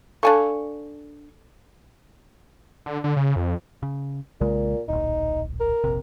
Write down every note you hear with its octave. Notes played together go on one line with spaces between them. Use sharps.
D4 A4 F5 G#5 C#6
D3
D3
C#3
F2
C#3
B1 A#2 C#3 G#3
D1 A#1 D#4
A#4
F1 A#1 C3